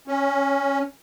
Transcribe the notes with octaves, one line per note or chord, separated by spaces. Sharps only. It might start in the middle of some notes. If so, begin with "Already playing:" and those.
C#4